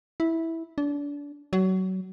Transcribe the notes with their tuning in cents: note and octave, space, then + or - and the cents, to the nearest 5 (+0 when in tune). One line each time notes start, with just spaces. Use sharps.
E4 -10
D4 -30
F#3 +25